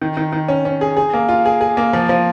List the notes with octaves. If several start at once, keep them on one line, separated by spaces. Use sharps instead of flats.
D#3
D#3
D#3
C#4
C#4
G#4
G#4
A#3
F4
G#4
G#4
A#3
F3
F3